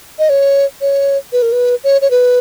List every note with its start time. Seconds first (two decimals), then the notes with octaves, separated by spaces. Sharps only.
0.19 D#5
0.29 C#5
0.81 C#5
1.33 B4
1.42 A#4
1.52 B4
1.84 C#5
2.02 C#5
2.11 B4